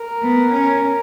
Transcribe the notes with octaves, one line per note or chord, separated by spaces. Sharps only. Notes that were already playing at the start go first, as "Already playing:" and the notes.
Already playing: A#4
B3
C#4